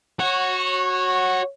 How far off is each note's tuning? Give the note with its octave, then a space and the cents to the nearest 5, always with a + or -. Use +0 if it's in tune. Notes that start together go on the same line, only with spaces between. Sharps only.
F#4 +0 C#5 -20